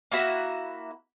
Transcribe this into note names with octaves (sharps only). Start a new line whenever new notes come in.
A#3 E4 F#4 B5